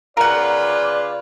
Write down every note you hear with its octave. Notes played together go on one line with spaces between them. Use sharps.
C#3 F4 A#4 B4 D5 F#5